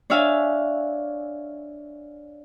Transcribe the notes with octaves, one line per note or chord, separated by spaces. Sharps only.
D4 C#5 E5 F5 G#5